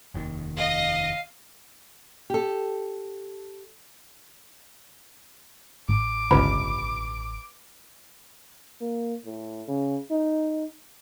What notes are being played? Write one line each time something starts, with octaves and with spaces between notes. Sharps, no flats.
F1 D#2 D#3
D#5 F5
G4 A4
A1 D6
G1 C#2 B4 A#5 B5
A#3
A2
C#3
D#4